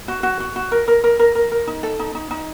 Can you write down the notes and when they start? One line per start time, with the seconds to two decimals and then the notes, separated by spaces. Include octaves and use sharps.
0.08 F#4
0.23 F#4
0.40 F#4
0.56 F#4
0.72 A#4
0.88 A#4
1.04 A#4
1.19 A#4
1.35 A#4
1.52 A#4
1.67 D#4
1.83 A4
1.99 D#4
2.15 D#4
2.31 D#4